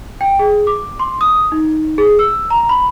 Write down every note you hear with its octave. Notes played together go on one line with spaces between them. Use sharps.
G5
G#4
D6
C6
D#6
D#4
G#4
E6
A#5
B5